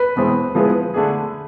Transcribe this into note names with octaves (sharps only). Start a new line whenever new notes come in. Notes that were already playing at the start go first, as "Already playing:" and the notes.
Already playing: B4
E2 B2 G#3 C4 E4
F3 G#3 B3 E4 G#4
D3 A3 D4 G#4